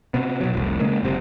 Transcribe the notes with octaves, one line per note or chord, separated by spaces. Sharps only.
C3 B3
B2 F#3
F1 C2
C#3 G#3 A#3
F#1 C3